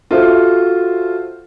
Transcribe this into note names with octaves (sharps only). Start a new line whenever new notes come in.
F4 F#4 A4 C5 E5